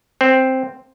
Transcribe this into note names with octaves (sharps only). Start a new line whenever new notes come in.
C4